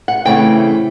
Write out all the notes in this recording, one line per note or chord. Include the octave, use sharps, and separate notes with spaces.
F#5
C#3 E3 A3 C4 G5